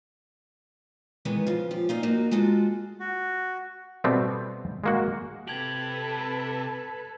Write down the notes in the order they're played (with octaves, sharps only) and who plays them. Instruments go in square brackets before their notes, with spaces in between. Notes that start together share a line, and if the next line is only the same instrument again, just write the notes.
[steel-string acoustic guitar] D#3 E3 G#3 B3
C#3 F3 F4
F3 G4
A#2 D#4 F4
A#3 D#4 F#4
G#3 F4 F#4 A4
[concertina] F#4
[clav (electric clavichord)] B2 G3 A3 B3 C4
G#3 A#3 F#4
[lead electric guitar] C3 G4 [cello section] A4 B4 [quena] A5 [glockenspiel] G#6 F7 F#7